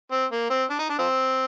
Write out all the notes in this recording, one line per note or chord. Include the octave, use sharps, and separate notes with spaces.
C4
A#3
C4
D4
D#4
D4
F3 C4